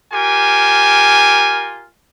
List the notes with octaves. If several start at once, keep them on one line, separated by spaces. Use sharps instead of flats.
F4 G4 A#4 G#5